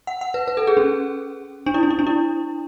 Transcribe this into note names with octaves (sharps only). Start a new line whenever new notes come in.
F#5
F#5
B4
B4
A4
G#4
C#4
D4
E4
D4
E4
D4
E4